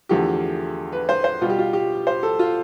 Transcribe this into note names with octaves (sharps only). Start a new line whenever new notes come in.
E2 D3 F3 A3 G4
B4
C5
C5
B2 G3 F4
G4
F4
G4
C5
A4
F4